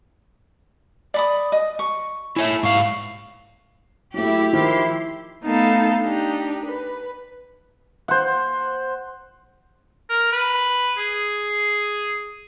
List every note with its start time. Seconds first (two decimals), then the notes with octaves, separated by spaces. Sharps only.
1.14 D5 B5 D#6
1.52 D#5
1.79 C#6
2.36 E4 C#5 E5 G#5
2.63 G#2 F5 C#6
4.14 F#3 A3 E4 G4
4.53 D#3 F3 E4 C6 C7
5.43 A3 B3 D#4 A4 F5
6.00 D4 D#4 G4
6.66 B4
8.08 C5 F#5
10.09 A#4
10.32 B4
10.98 G#4